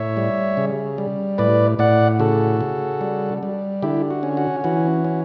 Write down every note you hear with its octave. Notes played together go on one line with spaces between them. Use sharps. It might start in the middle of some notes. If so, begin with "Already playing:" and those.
Already playing: A2 C#5 E5
G3
C#3
G3
A2 B4 D5
A2 D5 F#5
C#3 F#4 A4
C#3
G3
G3
D3 E4 G4
F#4
C#4
F#4
E3 F#4
C#4